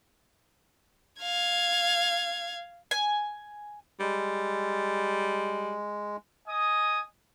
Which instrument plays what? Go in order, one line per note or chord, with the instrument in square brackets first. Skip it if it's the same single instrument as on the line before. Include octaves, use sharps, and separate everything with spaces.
[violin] F5 G#6
[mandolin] G#5
[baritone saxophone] G3 [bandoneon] G#3
[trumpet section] D#5 G#5 D#6